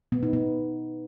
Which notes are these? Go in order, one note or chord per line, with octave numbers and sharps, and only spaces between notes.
B3
D#4
B3